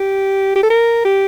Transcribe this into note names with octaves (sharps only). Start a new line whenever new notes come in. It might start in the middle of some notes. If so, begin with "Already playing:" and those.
Already playing: G4
G4
A4
A#4
G4